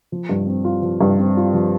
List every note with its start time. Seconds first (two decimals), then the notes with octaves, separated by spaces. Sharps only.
0.12 F3
0.29 G2
0.47 C4
0.64 F4
0.82 F3
1.01 G2
1.19 C4
1.37 F4
1.54 F3